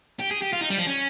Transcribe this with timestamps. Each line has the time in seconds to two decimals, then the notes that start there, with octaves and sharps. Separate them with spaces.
0.20 G4
0.31 G#4
0.42 G4
0.53 F4
0.61 D#4
0.70 G3
0.78 F3
0.87 C#4